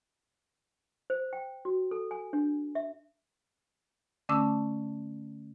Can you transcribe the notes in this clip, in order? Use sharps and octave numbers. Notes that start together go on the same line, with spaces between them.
C5
G5
F#4
A4
G#5
D4
E5
D3 A3 C#4 A5 D6 E6